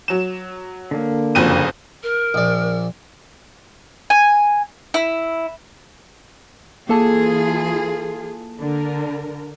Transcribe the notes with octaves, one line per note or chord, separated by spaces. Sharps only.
F#3 E7
D3 A#3
F#1 F2 D#7
A#4
A#1 D5
G#5
E4
E3 A#3 F4 G#4 A4 A5
D3 A#4